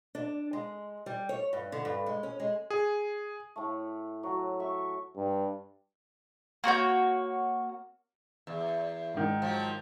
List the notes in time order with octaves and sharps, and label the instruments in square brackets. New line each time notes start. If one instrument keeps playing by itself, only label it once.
[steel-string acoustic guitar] D4
G#3
G3
C#5
G2
D3
G2
G#3
C#4
G#3
[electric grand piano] G#4
[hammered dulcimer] A2 A3
F#3
E5 C#6
[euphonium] G2
[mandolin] A#3 F#4 C#5 G6
[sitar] E2
[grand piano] G#2 D#3
[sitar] F3 F#3